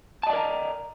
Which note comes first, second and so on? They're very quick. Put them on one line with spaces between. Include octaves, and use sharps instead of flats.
A5 D#5 D5 A#4 A#5